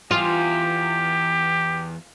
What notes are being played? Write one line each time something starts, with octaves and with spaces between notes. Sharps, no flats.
E2 F4 G4 G#4